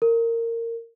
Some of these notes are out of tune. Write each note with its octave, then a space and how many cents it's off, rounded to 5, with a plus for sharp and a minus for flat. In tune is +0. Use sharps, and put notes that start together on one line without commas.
A#4 -20